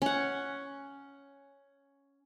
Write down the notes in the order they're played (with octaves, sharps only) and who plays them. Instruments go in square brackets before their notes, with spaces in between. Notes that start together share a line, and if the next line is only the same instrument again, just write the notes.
[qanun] C#4 F#5